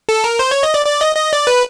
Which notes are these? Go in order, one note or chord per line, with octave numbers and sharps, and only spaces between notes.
A4
A#4
C5
C#5
D#5
D5
D5
D#5
D#5
D5
B4